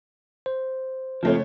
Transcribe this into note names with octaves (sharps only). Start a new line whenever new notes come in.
C5
F#1 F3 A3 C4 C#5